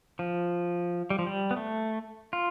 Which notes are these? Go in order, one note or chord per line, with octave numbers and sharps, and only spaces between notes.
F3
G3
F3
G3
B3
A3
F4